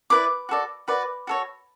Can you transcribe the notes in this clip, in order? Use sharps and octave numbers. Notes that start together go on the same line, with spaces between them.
E4 B4 D5 D6
F#4 A4 D5
F#4 B4 D5
F#4 A4 C#5